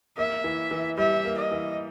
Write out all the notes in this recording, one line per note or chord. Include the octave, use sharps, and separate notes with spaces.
A#3 E5
E3
E3
G3 E5
A#3
D#5
E3